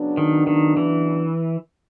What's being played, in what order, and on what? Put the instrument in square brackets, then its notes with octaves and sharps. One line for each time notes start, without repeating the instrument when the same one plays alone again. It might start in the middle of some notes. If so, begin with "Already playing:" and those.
Already playing: [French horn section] C#3 F#3 B3 D4
[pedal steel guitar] D#3
D#3
E3